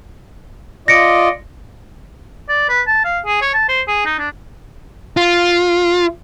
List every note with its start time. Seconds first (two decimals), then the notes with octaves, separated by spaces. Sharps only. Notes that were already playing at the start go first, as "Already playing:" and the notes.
0.88 F4 D5 D#5 A#6 C#7 D7
2.49 D5
2.69 B4
2.87 A5
3.05 F5
3.26 G#4
3.42 C#5
3.54 A5
3.68 C5
3.88 G#4
4.05 D#4
4.19 D4
5.17 F4